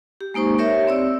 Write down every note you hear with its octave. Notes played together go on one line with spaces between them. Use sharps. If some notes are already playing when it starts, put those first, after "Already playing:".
G4
G#3 A#3 D#4 C5 C#6
G4 A#4 C#5 E5
C4 D5 E6